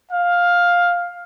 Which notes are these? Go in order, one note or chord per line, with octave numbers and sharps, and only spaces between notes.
F5